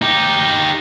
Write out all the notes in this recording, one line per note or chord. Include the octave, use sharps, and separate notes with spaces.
D#4 G4